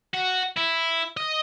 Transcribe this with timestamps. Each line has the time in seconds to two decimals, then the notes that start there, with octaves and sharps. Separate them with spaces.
0.14 F#4
0.57 E4
1.17 D#5